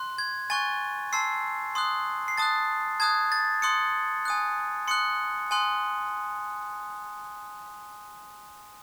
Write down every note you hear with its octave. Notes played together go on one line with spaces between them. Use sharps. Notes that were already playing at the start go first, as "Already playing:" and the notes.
Already playing: C6 F#6
G#6
G#5 C#6 F#6 A6
A5 C6 E6 C7
C6 D#6 F#6
C7
A5 D#6 F#6 A6
A5 D#6 F#6 G#6
A6
C6 D#6 F#6 C#7
G#5 D#6 F#6
C6 D#6 F#6 C#7
G#5 C6 D#6 F#6